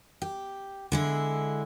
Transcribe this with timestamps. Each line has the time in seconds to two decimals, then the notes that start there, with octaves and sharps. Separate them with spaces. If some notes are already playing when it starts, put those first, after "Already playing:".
0.22 G4
0.92 D3 G#3 E4